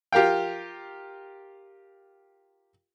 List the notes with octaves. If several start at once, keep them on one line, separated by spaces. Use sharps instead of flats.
F4 G4 A#4 F5 G5